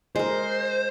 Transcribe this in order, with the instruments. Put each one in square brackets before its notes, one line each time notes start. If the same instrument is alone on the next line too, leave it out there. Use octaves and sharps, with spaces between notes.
[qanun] G#3 A#4 [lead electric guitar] C5